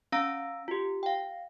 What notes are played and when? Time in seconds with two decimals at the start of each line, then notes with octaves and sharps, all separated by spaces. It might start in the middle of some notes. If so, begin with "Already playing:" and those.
0.12 C#4 F5 A#5 E6 A#6 D7
0.68 F4 G4
1.03 F5 G5